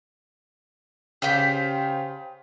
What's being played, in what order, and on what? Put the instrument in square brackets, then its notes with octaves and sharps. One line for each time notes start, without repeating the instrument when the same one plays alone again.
[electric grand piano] C#3 F5 B6 [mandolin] G4 C5 G5